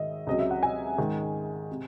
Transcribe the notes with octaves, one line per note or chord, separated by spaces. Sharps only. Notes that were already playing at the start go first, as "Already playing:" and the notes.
Already playing: G#2 D#3 D#5 E5
C#2 C3 F#3 D#5
E5
F#5
G#5
G#2 D#3 G#3
C3